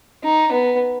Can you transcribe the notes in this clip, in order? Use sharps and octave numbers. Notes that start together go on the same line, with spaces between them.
D#4
B3